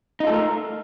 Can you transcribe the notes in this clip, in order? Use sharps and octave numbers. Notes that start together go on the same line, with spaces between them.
A3 D#4 F4 A4 A#4